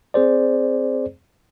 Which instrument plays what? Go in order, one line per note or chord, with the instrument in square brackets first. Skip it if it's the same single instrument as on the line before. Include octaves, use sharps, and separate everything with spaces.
[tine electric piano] C4 G#4 C5 D5